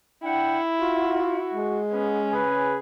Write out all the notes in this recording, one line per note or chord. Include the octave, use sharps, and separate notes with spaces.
D4 E4 F#5 G5
F4 F#4
G#3
B3 C#4
C#3 G#4 B4 G#5